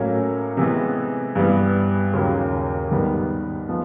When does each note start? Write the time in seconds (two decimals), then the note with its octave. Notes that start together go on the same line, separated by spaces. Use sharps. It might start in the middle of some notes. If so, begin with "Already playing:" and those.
Already playing: A2 F#3 A#3 C#4
0.57 C3 E3 G#3 B3
1.35 G2 E3 G3 B3
2.13 D#2 C#3 F#3 A#3
2.91 G#2 D#3 G3 B3
3.69 F3 G#3 B3